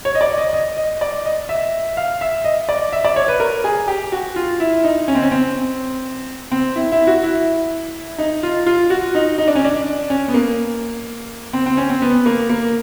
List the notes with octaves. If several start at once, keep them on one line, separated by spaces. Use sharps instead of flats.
C#5
D#5
D5
D#5
D#5
D#5
D5
D#5
E5
F5
E5
D#5
D5
E5
D5
C#5
B4
A#4
G#4
G4
F#4
F4
E4
D#4
C#4
C4
C#4
C4
C4
E4
E4
F#4
E4
D#4
F4
F4
F#4
D#4
D#4
D4
C#4
D4
C#4
B3
A#3
C4
C4
C#4
C4
B3
A#3
A#3